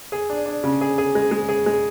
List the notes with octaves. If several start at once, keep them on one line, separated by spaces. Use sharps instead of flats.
G#4
D4
D4
C#3
G#4
G#4
G#3
G#3
G#4
G#3